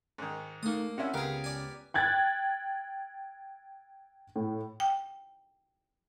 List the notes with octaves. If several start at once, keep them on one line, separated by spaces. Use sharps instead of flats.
G#2 D#3
A3 A#3 D#4 D#6
C3 C#4 E4 F#5
C#2 B3 G4 G#4 A#4 F5
D5 G#5
G5 F#6 G#6 A6
A2
G5